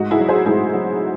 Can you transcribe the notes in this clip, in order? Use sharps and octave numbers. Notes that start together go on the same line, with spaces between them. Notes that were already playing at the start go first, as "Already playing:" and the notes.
Already playing: G#2 D#4 F#4
E4 G#4
F#3
G#4 C5
G#2 E4 G#4
F#3